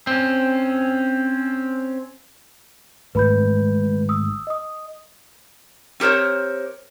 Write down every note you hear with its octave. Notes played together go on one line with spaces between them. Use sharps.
C4 C#4
G#1 G#2 A3 B4 B5 G6
D#6 E6
D#5 D#6
C4 G4 A#4 C5 C#5